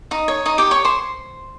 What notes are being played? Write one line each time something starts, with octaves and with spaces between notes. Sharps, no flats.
D#4 D#5
C#5
D#4 D#5
G4 G5
C#5 C#6
C5 C6